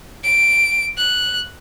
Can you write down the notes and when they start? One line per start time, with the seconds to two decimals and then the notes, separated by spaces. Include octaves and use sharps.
0.24 D7
0.98 F#6